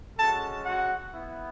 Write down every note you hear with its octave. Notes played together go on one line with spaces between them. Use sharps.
G#3 C#4 F#4 A4 A5
F#4 F#5
B3 E4